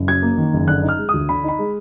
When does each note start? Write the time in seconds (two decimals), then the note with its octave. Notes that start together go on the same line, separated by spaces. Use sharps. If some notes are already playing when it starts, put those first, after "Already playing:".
Already playing: F#1
0.08 F#2 G#6
0.23 A#3
0.38 D#3
0.53 F#1
0.68 D3 F#6
0.83 D#4
0.89 F6
0.98 G#3
1.09 D2 D#6
1.29 D3 B5
1.44 D#4 B5
1.59 G#3